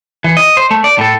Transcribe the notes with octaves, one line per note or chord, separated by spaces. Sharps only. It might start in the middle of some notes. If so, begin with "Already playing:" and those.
E3
D#5
C5
A3
D5
A2 A4